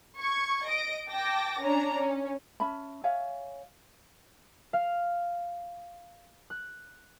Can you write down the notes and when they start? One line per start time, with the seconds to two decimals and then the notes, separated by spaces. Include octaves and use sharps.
0.19 C#6 G#6
0.66 D#5 A#6 D7
1.09 G5 A5 D6 A#6
1.61 C#4 D4 A#5
1.95 C#4
2.60 C#4 E5 A5 B5
3.04 C#5 E5 F5 G#5
4.73 F5
6.50 F#6